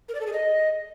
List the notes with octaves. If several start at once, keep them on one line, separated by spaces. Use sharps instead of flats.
A#4
D5
A4
G#4
D#5